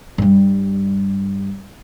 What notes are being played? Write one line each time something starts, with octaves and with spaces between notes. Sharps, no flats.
G2 G3